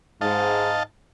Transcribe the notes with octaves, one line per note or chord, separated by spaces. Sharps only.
G#2 D#5 F5 A5